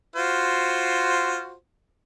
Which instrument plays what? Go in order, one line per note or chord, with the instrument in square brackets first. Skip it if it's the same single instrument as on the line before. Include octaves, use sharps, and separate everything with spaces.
[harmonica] F4 F#4 C5